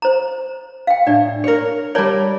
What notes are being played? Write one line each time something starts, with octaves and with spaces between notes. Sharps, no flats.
C5 A#5
F5 G5
A2 D4 D5
A#4 C#5
G3 A#4 C#5 D5 A5